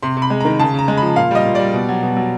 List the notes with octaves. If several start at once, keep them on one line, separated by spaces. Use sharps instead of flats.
C3 C6
C3
B5
G#3
D#3 A#5
C#3 A5
C#3 A#5
G#3
F3 B5
A#2 F5
G3 D#5
A#2
G3 D5
B2
F#3
B2
F#3